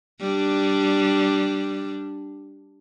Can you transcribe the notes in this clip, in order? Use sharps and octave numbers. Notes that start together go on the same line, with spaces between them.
G3 D4